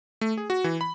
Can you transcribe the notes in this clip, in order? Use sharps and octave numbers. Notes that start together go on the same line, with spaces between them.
A3
G#4
F#4
E3
B5